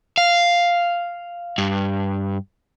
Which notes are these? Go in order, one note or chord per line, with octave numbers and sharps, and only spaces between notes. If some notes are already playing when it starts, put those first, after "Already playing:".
F5
G2